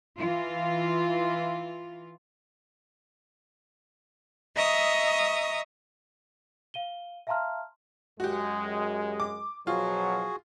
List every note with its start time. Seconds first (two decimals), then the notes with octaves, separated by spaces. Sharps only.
0.17 E3 F4
4.54 D#5 E5 A#5 C#6 D#6
6.74 F5 D#7 G7
7.27 E5 F5 A5 A#5 C6 F6
8.20 F#2 G#3 F#4 G4
9.20 D6
9.67 B2 F3 F#3 F4 F#4 G#4